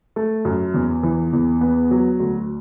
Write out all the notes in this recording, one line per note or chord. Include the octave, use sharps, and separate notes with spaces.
A3
F#2
E2
E3
E2
B3
F#3
D2